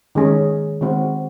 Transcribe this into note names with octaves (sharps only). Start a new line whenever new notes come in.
D#3 G#3 C#4 G#4
D#3 G#3 C4 F#4